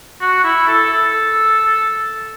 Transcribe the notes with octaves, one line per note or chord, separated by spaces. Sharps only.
F#4
E4
A4
A4